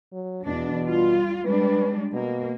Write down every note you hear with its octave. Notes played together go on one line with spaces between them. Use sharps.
F#3
E2 B2 D4
G3 F4
G3 G#3 D4 B4
B2 A#3